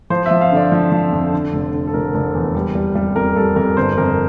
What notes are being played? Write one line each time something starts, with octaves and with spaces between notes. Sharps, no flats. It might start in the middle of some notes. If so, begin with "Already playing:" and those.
F3 C5
E5
F3
F5
D3 D5
F3
F3
F2
D3
F1
D3
A4
F1 A#4
F1
E2
G3
G3
G3
F2 A#4
G3 A4
F2 A#4
G1 C5
F2 A#4